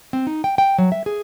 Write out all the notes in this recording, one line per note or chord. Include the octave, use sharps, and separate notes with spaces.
C4
D#4
G5
G5
F#3
E5
G#4